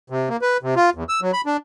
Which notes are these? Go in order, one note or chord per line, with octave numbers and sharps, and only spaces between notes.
C3
A#3
B4
C3
F4
E2
E6
F#3
B5
D4